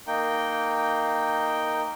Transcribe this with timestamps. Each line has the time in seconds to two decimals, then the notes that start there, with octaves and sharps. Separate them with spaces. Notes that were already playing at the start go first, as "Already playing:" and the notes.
0.07 A#3 D#4 G5